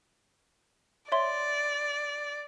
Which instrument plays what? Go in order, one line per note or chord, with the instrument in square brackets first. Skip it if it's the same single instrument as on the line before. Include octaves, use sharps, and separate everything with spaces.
[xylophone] C#5 E5 C6 [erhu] D5